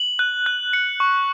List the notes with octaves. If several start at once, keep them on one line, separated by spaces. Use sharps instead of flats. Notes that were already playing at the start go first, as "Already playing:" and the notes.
Already playing: F#7
F#6
F#6
C#7
C#6